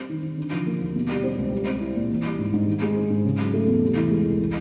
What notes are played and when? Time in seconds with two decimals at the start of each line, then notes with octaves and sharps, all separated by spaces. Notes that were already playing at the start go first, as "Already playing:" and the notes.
Already playing: G3 C4
0.09 D#3
0.23 D#3
0.37 D3
0.52 F3
0.67 A#3
0.81 D#2
0.95 B2
1.09 G3
1.24 C4
1.38 C#2
1.52 G3
1.67 C4
1.80 E4
1.96 A#2
2.10 E3
2.24 G3
2.38 G#2
2.53 G#2
2.67 D#3
2.82 G#3
2.95 C4
3.10 G#2
3.25 C#3
3.38 F#3
3.54 A3
3.67 E2
3.82 C3
3.96 E3
4.11 G#3
4.25 C2
4.39 E3